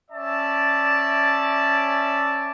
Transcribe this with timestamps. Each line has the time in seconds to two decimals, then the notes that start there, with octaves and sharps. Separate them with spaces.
0.11 C#4 D5 E5 A5